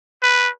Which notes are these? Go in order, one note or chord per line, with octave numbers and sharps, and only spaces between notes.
B4